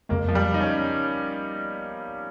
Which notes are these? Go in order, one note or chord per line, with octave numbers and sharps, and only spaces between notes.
F2 C#3 G#3 A#3
F3
G3
D#4
C#4